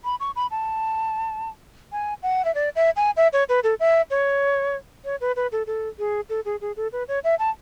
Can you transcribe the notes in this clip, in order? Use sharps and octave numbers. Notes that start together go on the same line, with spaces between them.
B5
C#6
B5
A5
G#5
F#5
E5
D5
E5
G#5
E5
C#5
B4
A4
E5
C#5
C#5
B4
B4
A4
A4
G#4
A4
G#4
G#4
A4
B4
C#5
E5
A5